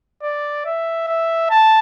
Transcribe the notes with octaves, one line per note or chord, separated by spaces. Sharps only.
D5
E5
E5
A5